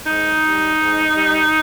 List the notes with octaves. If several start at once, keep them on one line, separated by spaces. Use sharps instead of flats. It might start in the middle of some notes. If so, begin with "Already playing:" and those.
G#2 D#4
G3
G#2
G3